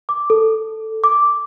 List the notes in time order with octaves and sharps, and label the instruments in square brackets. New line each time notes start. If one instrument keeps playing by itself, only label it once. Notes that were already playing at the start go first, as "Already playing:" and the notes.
[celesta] D6
A4
D6